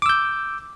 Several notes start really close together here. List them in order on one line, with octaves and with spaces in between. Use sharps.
D6 E6 G6